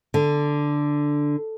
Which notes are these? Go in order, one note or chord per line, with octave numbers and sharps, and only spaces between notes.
D3